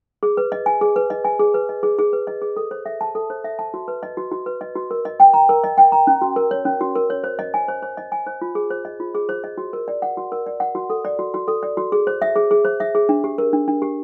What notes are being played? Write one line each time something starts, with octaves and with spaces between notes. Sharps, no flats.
G#4
B4
D#5
G#5
G#4
B4
D#5
G#5
G#4
B4
D#5
G#4
G#4
B4
D#5
G#4
A4
C5
E5
A5
A4
C5
E5
A5
F#4
B4
D#5
F#4
F#4
B4
D#5
F#4
A#4
D#5
G5
A#5
A#4
D#5
G5
A#5
C#4
F#4
A#4
C#5
C#4
F#4
A#4
C#5
C5
D#5
G#5
C5
C5
D#5
G#5
C5
F4
G#4
C5
D#5
F4
G#4
C5
D#5
F#4
A#4
D5
F#5
F#4
A#4
D5
F#5
F#4
A4
D5
F#4
F#4
A4
D5
F#4
G#4
C5
E5
G#4
G#4
C5
E5
G#4
D4
G4
A#4
D4
D4
G4